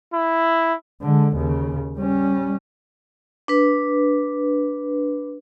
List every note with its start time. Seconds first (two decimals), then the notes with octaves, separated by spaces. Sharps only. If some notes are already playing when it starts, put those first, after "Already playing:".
0.14 E4
1.01 D3 G#3
1.36 D#2 C#3
1.98 G3 C#4
3.48 D4 B4